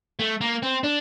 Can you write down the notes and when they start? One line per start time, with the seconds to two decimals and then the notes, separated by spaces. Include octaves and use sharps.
0.19 A3
0.41 A#3
0.63 C4
0.84 D4